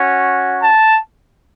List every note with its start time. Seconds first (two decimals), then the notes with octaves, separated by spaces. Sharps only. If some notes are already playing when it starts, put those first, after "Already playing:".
Already playing: C#4 F#4
0.61 A5